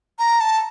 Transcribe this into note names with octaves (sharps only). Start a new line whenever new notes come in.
A#5
A5